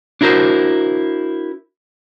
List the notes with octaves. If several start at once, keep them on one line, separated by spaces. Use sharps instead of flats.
D4 E4 F#4 A#4 C5